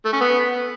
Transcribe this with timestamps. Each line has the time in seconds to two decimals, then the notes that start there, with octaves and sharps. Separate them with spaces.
0.05 A3
0.13 C#4
0.21 B3